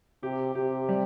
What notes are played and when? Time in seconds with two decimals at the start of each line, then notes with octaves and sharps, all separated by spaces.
0.23 C3 G4
0.55 C3 G4
0.89 G3